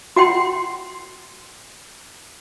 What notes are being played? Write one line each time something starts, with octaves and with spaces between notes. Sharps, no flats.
F#4 F#5 G5 C6